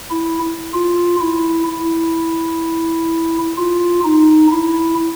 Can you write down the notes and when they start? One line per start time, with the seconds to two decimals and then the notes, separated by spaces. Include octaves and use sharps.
0.11 E4
0.74 F4
1.21 E4
1.68 E4
3.58 F4
4.05 D#4
4.52 E4